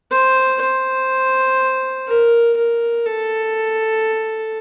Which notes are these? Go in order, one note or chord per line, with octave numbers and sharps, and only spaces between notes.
C5
C5
A#4
A#4
A4